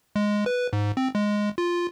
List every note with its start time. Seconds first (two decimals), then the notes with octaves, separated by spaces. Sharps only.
0.16 G#3
0.46 B4
0.73 G#2
0.97 C4
1.15 G#3
1.58 F4